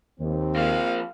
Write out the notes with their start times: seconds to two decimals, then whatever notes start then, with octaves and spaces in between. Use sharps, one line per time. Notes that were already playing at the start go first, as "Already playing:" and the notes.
0.20 D#2 C4
0.56 F3 A#3 F5